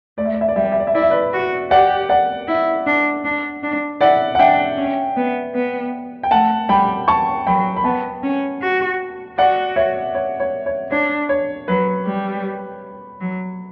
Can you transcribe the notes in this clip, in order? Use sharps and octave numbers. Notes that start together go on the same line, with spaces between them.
A3 D5
E5
D5
E5
D5
G3 E5
D5
E5
D5
E5
E4 D5
E5
B4 D5
F#4
G4 D5 F#5
D5 F#5
E4
D4
D4
D4
E4 D5 F#5
F#5
D4 E5 G5
C#4
B3
B3
G5
A3 F#5 A5
G3 G5 B5
A5 C#6
F#3 G5 B5
B5
B3 F#5 A5
C#4
F#4
F#4 D5 F#5
C#5 E5
C#5
C#5
C#5
D4 C#5
C#5
F#3 B4
G3
F#3